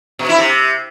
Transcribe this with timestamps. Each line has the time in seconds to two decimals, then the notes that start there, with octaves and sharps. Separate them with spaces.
0.19 B2
0.29 E4
0.39 C3